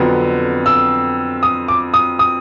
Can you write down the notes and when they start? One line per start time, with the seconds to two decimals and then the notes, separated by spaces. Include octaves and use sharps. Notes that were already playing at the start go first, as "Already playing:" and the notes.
Already playing: F2 D3 F#3 B3
0.66 E6
1.43 D#6
1.68 D6
1.94 D#6
2.19 D#6